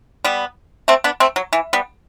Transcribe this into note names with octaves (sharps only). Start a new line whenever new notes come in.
G3 B3
A3 C4
B3 D4
A3 C4
F#3
E3
G3 B3